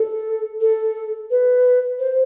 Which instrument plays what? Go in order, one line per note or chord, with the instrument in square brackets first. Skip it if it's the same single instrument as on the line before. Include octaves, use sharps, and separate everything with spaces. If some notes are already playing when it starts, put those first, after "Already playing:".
Already playing: [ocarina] A4
A4
B4
C5